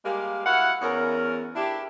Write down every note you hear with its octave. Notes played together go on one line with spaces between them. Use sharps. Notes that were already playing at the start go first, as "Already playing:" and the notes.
G3 G#3 A#3 A#4 F5
E4 F#4 F5 F#5
E2 C#4 A#4
D4 E4 G4